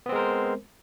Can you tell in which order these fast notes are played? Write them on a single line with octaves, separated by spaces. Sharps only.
B3 C4 G#3 A#4 C5